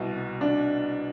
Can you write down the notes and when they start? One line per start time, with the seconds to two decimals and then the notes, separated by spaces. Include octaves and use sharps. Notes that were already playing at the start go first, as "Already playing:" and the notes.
Already playing: C2 B2
0.41 D4